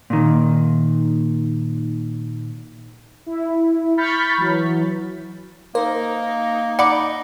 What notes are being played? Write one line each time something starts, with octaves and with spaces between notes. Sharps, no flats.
A#2 D#3
E4
B5 C#6 F6 G6 A6 B6
E3 F#3
A#3 D#4 A#4 C5
D#4 D5 F#5 B5 D6